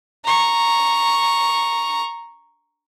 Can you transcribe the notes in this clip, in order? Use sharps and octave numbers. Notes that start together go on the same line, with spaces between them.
A#5 C#6